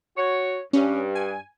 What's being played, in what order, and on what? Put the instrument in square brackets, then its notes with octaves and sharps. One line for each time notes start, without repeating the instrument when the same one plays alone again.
[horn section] F#4 C#5
[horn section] G2 [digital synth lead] C#4
[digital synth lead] G#5